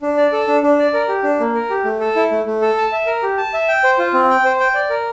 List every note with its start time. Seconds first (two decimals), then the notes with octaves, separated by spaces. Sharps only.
0.02 D4
0.17 D5
0.32 A4
0.47 D4
0.63 D4
0.79 D5
0.94 A#4
1.08 G4
1.24 D4
1.40 A#3
1.55 A#4
1.70 G4
1.85 A3
2.00 A4
2.16 E4
2.31 A3
2.46 A3
2.62 A4
2.77 A5
2.92 E5
3.07 A#4
3.23 G4
3.38 A5
3.54 E5
3.68 G5
3.84 C5
3.99 F4
4.14 C4
4.30 G5
4.45 C5
4.60 G5
4.74 D5
4.90 A#4